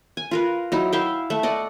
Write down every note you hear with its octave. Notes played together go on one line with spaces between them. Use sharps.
G#5
F4 A#4 B4
F#3 D#4 E4
E4 E5 F5 G5
A3 E5
D5 D#5 F#5